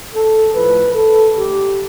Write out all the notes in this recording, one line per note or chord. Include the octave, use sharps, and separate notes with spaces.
A4
A2 F3 A3 B4
A4
D3 A3 G4